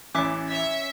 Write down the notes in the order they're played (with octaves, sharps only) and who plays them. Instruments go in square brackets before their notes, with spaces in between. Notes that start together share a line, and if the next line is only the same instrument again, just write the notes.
[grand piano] A1 E3 [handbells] C#4 [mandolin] E5 D6 F#6
[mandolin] C#5 [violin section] E5